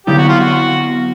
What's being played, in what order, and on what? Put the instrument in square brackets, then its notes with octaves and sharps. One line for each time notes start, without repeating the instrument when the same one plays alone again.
[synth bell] D3 F#3 B3 E4 [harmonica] G4
[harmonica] F#4
F4
F#4